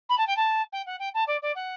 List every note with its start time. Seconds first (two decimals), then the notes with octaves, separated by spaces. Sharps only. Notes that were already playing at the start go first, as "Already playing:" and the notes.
0.09 B5
0.17 A5
0.27 G5
0.36 A5
0.72 G5
0.86 F#5
0.99 G5
1.14 A5
1.27 D5
1.42 D5
1.55 F#5